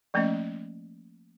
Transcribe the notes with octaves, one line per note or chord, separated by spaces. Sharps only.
F3 A3 A#3 C#4 D#5